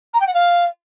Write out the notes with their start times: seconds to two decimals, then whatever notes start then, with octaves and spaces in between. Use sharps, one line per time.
0.14 A#5
0.20 G5
0.27 F#5
0.34 F5